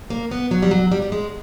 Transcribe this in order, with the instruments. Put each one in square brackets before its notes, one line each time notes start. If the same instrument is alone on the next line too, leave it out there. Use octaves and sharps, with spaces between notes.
[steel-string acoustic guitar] A#3
B3
F#3
G3
F#3
G3
G3
G#3